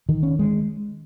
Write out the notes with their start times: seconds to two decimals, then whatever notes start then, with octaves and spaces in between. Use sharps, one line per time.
0.09 D#3
0.23 C#4
0.39 G#3